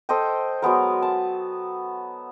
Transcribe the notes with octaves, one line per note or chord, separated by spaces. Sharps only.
A4 C5 D#5 G5
F#3 G#3 B3 A#4
A5